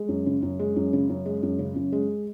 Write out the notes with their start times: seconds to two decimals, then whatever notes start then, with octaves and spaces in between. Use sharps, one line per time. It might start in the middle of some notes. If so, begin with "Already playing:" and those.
Already playing: G#3
0.09 F#2
0.26 C#3
0.42 F#2
0.59 G#3
0.76 F#2
0.93 C#3
1.09 F#2
1.26 G#3
1.43 F#2
1.59 C#3
1.76 F#2
1.92 G#3